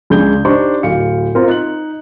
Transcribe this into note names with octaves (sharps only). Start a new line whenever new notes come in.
C#2 C#3 D4 G#4 G6 G7
D4 D#4 G4 C5 C#6
D1 F5 C#7
C4 F4 A#4
D#4 F#6 F#7